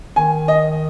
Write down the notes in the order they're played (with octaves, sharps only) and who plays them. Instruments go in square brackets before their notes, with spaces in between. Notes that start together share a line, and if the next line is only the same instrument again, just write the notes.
[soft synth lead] D#3 [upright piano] G#5
[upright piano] D#5